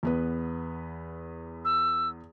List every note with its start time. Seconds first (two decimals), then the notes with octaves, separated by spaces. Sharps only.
0.03 E2 B3 B4
1.65 E6